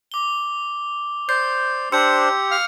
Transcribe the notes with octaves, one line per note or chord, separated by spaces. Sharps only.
D6 G7
C5 D5 G6 C7
D4 G4 C5 C6 E6 G6 C#7
F5 F6